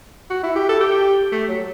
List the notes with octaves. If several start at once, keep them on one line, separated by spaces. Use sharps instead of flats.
F#4
E4
G4
A4
G4
A3
F#3